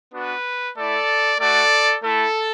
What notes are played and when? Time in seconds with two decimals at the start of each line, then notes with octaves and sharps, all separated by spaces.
0.13 B3 D4 F#4 B4
0.76 A3 E4 A4 D5
1.39 A3 F#4 A4 D5
2.03 A3 E4 A4